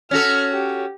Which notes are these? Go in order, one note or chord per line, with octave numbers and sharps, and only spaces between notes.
C#4 F#4 A4 F6
G4